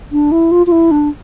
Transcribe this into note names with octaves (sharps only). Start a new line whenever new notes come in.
D4
E4
F4
F4
E4
D4